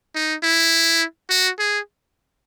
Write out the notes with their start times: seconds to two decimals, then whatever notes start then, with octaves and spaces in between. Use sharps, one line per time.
0.15 D#4
0.43 E4
1.30 F#4
1.59 G#4